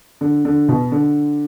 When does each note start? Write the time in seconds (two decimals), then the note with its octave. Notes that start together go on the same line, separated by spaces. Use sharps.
0.21 D3
0.45 D3
0.69 B2
0.92 D3